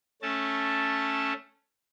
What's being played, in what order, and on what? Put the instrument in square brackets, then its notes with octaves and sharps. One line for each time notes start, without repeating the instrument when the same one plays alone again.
[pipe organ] A3 C#4 A5